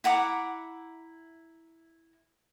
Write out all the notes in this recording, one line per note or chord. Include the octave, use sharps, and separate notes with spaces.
E4 F#5 A#5 D6